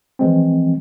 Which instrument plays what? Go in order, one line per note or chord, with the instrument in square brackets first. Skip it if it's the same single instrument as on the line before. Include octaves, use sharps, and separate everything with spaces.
[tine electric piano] E3 F3 G#3 C4